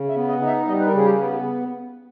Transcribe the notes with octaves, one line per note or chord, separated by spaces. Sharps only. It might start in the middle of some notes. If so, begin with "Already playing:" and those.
Already playing: C#3
E5
B3
D#5
D#4
E5
G3 D#5
B4
A#4
C#3 G#4
G4
B3